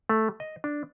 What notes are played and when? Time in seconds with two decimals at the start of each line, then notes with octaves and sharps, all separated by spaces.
0.09 A3
0.40 D#5
0.64 D4